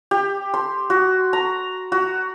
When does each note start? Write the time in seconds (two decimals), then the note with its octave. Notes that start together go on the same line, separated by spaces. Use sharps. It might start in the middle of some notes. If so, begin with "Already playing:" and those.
0.11 G4
0.54 C6
0.90 F#4
1.33 A#5
1.92 F#4